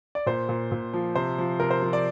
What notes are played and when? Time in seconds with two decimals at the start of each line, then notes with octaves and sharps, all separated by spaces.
0.15 D5
0.26 A#2 C5
0.49 A#2
0.72 A#2
0.93 F3
1.15 C3 C5
1.38 F3
1.60 C3 A#4
1.70 C5
1.82 F3
1.93 D5